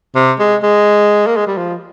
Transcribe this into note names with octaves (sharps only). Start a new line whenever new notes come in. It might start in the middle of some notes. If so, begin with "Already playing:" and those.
C3
G#3
G#3
A#3
G#3
G3
F3